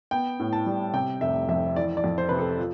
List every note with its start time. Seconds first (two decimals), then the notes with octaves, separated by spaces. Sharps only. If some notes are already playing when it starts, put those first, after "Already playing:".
0.11 B3 G5
0.40 A2
0.53 A5
0.66 G3
0.94 C3 G5
1.21 F1 E5
1.49 F2 E5
1.76 E3 D5
1.97 D5
2.04 F2
2.18 C5
2.29 C3 B4
2.39 A4
2.59 F3